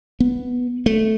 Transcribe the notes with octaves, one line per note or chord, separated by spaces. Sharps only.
B3
A3